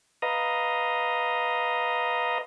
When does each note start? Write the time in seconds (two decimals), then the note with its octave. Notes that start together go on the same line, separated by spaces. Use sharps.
0.22 B4 D#5 F5 A#5 D#6